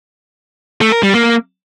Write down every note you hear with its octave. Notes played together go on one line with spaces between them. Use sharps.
A3
A#4
G3
A#3